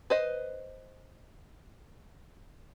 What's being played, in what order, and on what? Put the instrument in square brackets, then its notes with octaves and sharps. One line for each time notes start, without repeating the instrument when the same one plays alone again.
[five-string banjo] B4 C5 D#5